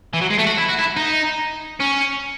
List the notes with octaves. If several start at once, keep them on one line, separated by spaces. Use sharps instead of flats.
E3
F#3
G#3
A3
F#4
E4
F#4
E4
D#4
C#4